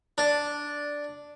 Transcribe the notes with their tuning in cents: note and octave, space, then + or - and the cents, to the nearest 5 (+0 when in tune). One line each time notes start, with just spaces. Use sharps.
D4 -5